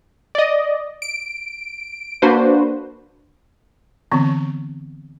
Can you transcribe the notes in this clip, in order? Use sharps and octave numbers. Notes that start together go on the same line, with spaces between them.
D5 D#5
D7
A#3 D4 F#4 B4 C5
D3 E3 B3 C4